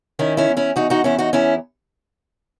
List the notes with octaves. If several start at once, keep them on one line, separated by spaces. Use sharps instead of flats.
D#3 C#4 E4
C#4 E4
E2
C#4 E4
E2 D#4 F#4
D#4 F#4
E2 C#4 E4
D#4 F#4
E2 C#4 E4